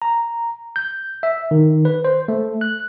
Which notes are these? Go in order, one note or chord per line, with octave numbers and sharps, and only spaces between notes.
A#5
G6
E5
D#3
B4
C5
A3
F#6